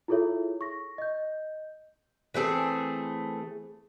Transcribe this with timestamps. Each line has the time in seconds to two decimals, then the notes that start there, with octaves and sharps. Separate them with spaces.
0.08 E4 F4 G#4 A4 C#5 E5
0.61 C#6 A#6
0.98 D#5 G6
2.34 E3 A3 C4 G#4